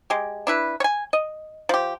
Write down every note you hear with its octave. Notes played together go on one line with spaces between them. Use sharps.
G#3 G4
D4 E4 B4
C#5 G#5
D#5
F3 G4